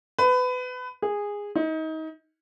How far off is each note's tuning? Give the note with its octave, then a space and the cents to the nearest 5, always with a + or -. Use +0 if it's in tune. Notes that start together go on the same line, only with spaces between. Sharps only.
B4 +25
G#4 -15
D#4 +30